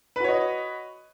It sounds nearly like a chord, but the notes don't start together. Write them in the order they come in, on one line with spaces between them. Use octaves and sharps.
B4 F#4 C#5 D#5